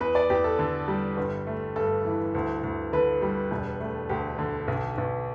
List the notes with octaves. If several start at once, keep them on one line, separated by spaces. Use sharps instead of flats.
E2 B4
D5
E2 G4
A4
D3
G3
G1
A3
G2 A4
E3
D2
D2
D3 B4
G3
E1
A3
D2 G4
D3
B1
B1